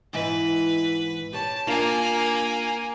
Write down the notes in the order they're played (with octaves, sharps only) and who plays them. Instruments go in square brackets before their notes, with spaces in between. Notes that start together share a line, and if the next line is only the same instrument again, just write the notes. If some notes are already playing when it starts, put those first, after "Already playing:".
[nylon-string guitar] G#2 E3 [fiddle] B4
[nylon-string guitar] G4 C#5 [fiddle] A5
[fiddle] A#3 G#5 [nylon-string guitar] D4 F4